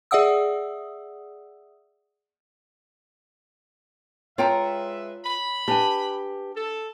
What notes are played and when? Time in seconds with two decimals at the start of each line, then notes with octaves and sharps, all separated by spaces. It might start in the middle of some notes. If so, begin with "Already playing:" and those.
0.11 G#4 D5 E5 F#5 D#6 E6
4.38 G#3 F4 B4 C#5 E5 G5 A#5
5.24 B5
5.68 D4 G4 B4 G#5
6.56 A4